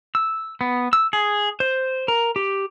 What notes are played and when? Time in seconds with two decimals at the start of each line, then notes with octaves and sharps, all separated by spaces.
0.15 E6
0.61 B3
0.93 E6
1.13 G#4
1.60 C5
2.08 A#4
2.36 G4